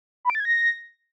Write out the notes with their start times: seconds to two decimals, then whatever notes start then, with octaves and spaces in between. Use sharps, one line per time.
0.25 B5
0.30 D7
0.35 A6
0.40 G#6
0.45 A#6